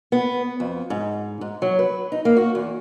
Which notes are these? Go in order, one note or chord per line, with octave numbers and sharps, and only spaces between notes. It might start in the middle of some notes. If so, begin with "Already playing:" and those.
B3
F2
G#2
G#2
F#3
B4
D#4
A#3
F#4
E2